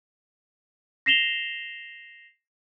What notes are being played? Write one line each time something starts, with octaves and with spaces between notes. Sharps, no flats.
A#6 C7 E7 F7 G7